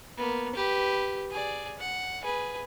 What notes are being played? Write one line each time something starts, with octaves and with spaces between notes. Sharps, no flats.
A#3 B3
G4 B4
G#4 D5
F#5
G#4 B4